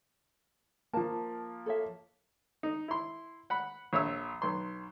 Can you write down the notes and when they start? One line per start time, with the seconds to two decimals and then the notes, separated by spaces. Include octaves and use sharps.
0.93 F3 A#3 A5
1.66 A4 C#5 E5
2.63 D#4
2.88 E4 C6
3.50 F#5 B5
3.93 A#1 C#5 E5 E6
4.42 B1 C6